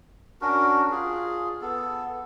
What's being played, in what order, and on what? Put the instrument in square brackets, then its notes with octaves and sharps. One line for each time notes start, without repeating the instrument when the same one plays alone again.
[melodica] C#4 D4 F#4 A#4
F4 G#4
B3 A4